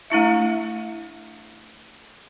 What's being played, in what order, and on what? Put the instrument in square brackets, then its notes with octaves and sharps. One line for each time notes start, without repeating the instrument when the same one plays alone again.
[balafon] A3 D4 E4 E5